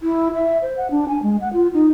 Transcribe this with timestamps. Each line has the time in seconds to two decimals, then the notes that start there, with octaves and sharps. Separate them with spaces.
0.02 E4
0.34 E5
0.62 C5
0.77 F#5
0.91 D4
1.08 G#5
1.23 G#3
1.41 F#5
1.53 F4
1.74 D#4